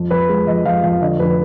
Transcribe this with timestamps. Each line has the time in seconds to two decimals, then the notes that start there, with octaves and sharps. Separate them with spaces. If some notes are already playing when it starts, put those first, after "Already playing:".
Already playing: F2
0.11 F2 B4
0.29 G#3
0.47 F2 D#5
0.65 F2 F5
0.83 F2 F5
1.01 D3 D#5
1.19 F1 B4